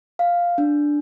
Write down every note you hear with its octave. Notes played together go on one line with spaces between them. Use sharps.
F5
D4